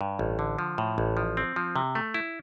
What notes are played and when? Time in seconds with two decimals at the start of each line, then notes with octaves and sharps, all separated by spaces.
0.01 G2
0.19 A1
0.39 D3
0.59 F3
0.78 A2
0.98 A1
1.17 F3
1.37 C4
1.56 F3
1.76 C3
1.95 A3
2.14 E4